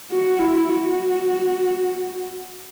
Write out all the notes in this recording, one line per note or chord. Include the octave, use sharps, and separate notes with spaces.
F#4
E4
F#4